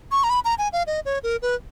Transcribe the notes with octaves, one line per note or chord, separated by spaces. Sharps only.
C#6
A#5
B5
A#5
G#5
F5
D#5
C#5
A#4
B4